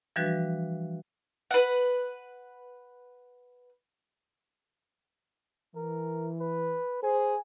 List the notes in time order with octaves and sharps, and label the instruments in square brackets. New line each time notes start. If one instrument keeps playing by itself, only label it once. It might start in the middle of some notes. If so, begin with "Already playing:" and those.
[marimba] E3 F3 G3 D4 F#4 B4
[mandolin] B4 F#5
[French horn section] E3 [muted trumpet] A#4
[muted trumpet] B4
[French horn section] G#4 C5 [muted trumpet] G#5